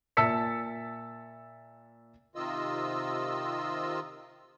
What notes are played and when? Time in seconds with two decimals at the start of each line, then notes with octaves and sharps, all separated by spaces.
0.17 A#2 E5 A5 E6 B6 C#7
2.35 C3 D#3 F4 D#5 E6